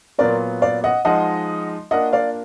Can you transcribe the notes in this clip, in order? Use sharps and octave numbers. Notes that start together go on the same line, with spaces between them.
A#2 F#3 B3 F4 A#4 D5
D5 F5
D#5 F#5
F3 G#3 D#4 D#5 F#5
A#3 D4 F4 A#4 D#5 F#5
D5 F5